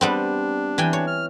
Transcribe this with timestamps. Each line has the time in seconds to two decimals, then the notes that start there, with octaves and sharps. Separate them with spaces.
0.01 G3 B3 C4 D4
0.78 E3 G5 G#5
0.93 C#5
1.07 F6